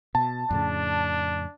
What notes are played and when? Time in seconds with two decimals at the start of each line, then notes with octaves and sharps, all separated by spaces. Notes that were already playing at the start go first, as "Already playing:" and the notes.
0.15 B2 A5
0.51 F2 A2 C#3 D4